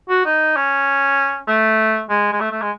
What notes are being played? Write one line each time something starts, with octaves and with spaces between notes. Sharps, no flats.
F#4
D#4
C#4
A3
G#3
G#3
A3
A3
G#3